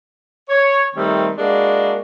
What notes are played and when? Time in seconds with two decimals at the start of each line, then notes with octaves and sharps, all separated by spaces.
0.49 C#5
0.94 D#3 G3 A3 C4
1.38 G#3 A#3 D4 E4 F#4